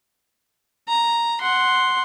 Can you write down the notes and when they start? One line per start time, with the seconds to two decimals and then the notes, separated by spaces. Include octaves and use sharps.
0.88 A#5
1.41 F#5 C6